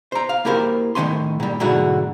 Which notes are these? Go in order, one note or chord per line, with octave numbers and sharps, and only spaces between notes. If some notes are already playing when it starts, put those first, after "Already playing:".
C5 A#5
F5
A#3 E4 G4 A#4 C5
A2 D#3 C4 C#4 G#5 C6
A#2 G3
G#2 B2 D3 F#3 E4 F#4